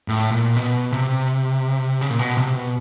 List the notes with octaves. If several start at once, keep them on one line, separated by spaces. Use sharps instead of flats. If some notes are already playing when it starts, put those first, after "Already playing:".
A2
A#2
B2
C3
C#3
A#2
B2
C3
B2